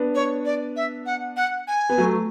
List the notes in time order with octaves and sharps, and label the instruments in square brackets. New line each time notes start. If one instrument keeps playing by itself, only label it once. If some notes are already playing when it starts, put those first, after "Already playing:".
Already playing: [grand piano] B3 D4
[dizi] C#5
D5
E5
F#5
F#5
G#5
[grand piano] B3
F#3 A3